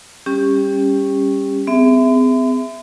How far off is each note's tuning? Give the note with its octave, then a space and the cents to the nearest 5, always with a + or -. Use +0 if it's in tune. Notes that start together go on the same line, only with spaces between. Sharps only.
G3 +10 C#4 -10 G4 +20
C4 -45 G#4 -10 E5 +0